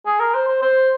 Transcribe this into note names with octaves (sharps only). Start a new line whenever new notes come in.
G#4
A#4
C5
C5
C5